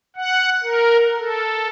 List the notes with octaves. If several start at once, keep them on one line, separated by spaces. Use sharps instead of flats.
F#5
A#4
A4